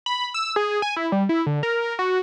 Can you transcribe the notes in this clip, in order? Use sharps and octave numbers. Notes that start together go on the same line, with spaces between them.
B5
E6
G#4
G#5
E4
G3
E4
D3
A#4
F#4